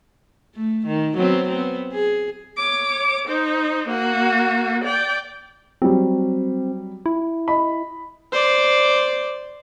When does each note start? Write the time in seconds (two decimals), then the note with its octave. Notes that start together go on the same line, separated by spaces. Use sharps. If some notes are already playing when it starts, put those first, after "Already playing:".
0.55 A3
0.87 D#3
1.17 F#3 B3 C4
1.49 B3 C4
1.93 G#4
2.57 C#5 D6
3.28 D#4 C5
3.88 A#3 F#4
4.84 D5 G5
5.82 F#3 G3 C4
7.06 E4
7.48 D#5 B5
8.32 C5 D5